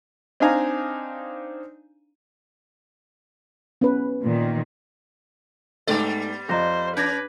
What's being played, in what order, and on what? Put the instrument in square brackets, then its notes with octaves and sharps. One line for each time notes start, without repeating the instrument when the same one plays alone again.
[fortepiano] C4 D4 D#4 F5 G#5 A#5
[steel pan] B3 C#4 B4
[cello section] A#2 D#3
[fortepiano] G#2 A3 [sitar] G3 B3 D5
[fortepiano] F2 [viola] C5 [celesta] D#5 A#5 A#6
[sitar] C#4 [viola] B4 [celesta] G6 G#6 A#6